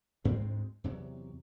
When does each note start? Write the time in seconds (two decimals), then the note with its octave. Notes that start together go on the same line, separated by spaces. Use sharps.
0.24 D2 G#2 G#3 C4
0.84 E2 C3 F#3